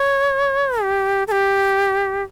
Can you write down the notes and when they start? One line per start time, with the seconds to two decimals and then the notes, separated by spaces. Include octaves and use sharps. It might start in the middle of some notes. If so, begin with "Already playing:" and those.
Already playing: C#5
0.81 G4
1.28 A4
1.32 G4